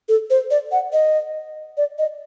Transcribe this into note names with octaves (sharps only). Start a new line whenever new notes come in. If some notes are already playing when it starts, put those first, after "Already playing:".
A4
C5
D5
F#5
D#5
D5
D#5